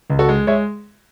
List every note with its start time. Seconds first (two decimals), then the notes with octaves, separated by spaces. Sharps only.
0.10 C#2
0.19 F#4 A4
0.29 G#3
0.47 G#3 C#5 E5